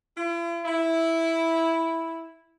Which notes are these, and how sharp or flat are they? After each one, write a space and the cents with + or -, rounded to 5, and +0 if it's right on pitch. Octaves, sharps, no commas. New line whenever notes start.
E4 +45
E4 -5